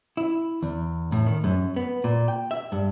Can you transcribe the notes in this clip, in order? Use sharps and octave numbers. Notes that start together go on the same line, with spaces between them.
E4
E2
A2
D#3
F#2
B3
A#2
G5
E5
G2